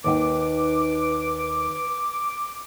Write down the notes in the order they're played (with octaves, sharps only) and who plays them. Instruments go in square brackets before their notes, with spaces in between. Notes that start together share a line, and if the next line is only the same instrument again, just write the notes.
[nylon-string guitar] D#2 D#3 G5 [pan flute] B4 [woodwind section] D6